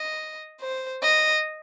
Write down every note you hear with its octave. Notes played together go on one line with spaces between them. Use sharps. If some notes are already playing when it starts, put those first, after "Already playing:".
Already playing: D#5
C5
D#5